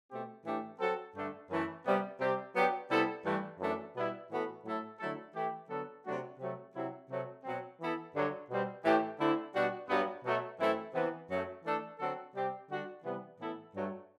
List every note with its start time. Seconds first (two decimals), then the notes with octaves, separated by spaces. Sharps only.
0.10 B2 A3 C4 G4
0.46 A2 E3 A3 D4 G4
0.80 F#3 C4 F#4 A4
1.16 G2 D3 A3
1.50 F#2 E3 A3
1.86 C3 G3 B3
2.20 C3 G3 C4 G4
2.55 F#3 B3 D4 G4
2.90 C3 G3 B3 E4 A4
3.25 G2 E3 A3
3.60 F#2 E3 A3 D4
3.95 B2 G3 B3 E4
4.31 A2 E3 B3 F#4 A4
4.65 A2 F#3 A3 E4 A4
5.00 D3 F#3 A3 E4 A4
5.35 E3 A3 E4 G4
5.70 D3 F#3 B3 F#4 A4
6.06 C3 F#3 A3 D4 F#4
6.39 C3 F#3 A3
6.75 C3 F#3 C4 E4
7.10 C3 F#3 A3
7.44 B2 F#3 C4
7.81 E3 B3 E4 A4
8.14 G2 D3 F#3
8.51 B2 G3 C4
8.85 A2 E3 A3 E4 G4
9.19 D3 A3 C4 E4
9.55 B2 G3 D4 F#4
9.90 G2 F#3 B3
10.24 B2 F#3 A3
10.59 F#2 E3 A3 C4 E4
10.95 C3 E3 B3
11.30 F#2 F#3 A3
11.64 E3 A3 D4 A4
11.99 D3 F#3 C4 F#4 A4
12.35 C3 G3 C4 G4
12.69 D3 G3 D4 F#4
13.04 C3 E3 G3 B3
13.40 A2 E3 B3 E4 A4
13.75 G2 F#3 A3